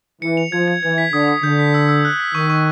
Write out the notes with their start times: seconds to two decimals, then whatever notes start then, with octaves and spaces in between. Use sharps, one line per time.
0.22 E3 C#7
0.37 F7
0.52 F3 G#6
0.68 G#6
0.83 E3 G#6
0.98 B6
1.13 D3 D#6
1.28 D#6
1.43 D3 G6
1.59 B6
1.74 E6
1.89 E6
2.05 F#6
2.20 B6
2.35 D#3 C#6
2.50 C#6